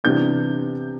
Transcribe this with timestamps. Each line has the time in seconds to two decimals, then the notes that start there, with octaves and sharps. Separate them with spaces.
0.04 C3 E3 G3 B3 D4 G6